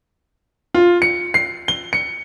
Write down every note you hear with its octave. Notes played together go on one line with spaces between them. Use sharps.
F4
C#7
C7
G7
C#7